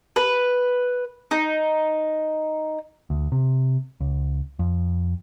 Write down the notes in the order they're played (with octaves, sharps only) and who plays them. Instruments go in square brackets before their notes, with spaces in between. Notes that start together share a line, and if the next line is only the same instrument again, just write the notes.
[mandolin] B4
D#4
[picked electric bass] D2
C3
C#2
F2